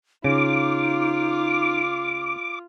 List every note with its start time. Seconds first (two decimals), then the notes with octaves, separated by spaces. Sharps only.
0.24 C#3 D#4 F4 D6